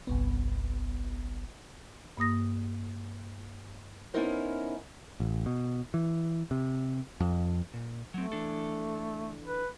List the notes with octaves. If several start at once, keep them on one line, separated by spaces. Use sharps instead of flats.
G1 C2 B3
G2 A#3 D#6 A#6
B3 C#4 D#4 E4 A#4 C5
A1
B2
E3
C3
F2
A#2
F#3 A3 C4
E3 D4 A4
B4